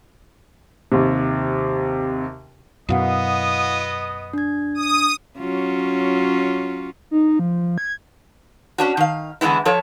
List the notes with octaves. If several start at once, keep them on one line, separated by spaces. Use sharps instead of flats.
D#2 C3
F#2 B2 B3 E4 D#5 F5 F#5 D#6
D4 G#6
D#6
F#3 C#4 F4
D#4
F3
G#6
C#4 D4 F#4
D#3 F5
D3 E3 G#3 B3 E4
F3 A4 C#5